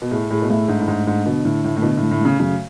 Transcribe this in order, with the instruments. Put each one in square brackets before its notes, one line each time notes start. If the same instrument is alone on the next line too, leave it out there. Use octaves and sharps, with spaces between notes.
[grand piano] B2
[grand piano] A2 [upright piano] G#4
[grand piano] A2 [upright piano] G#4
[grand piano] B2
[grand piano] A2 [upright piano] A3
[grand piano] G#2 [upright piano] D4
[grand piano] A2
[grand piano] G#2 [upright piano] A3
[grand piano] G#2 [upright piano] D4
[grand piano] B2 [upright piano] D3
[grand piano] A2 [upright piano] D3
[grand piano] A2 [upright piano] A3
[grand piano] A2
[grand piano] B2 [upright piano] D3
[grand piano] A2 [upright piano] A3
[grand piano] A2
[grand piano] C#3 [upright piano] A3
[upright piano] F#2 [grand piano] C#3